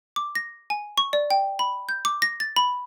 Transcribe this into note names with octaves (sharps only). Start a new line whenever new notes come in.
D6
A#6
G#5
C#6
D5
G5
B5
G6
D6
A#6
A6
B5